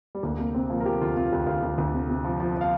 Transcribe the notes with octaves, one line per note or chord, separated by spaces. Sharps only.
G3
D2 A#3
C3 A#3
C3 C4
F3 A#3
A#4
F3 G4
D2 F4
C3 F4
D2 G4
D2 F5
D2
D2
C3
C3
F3
F3
F3 F5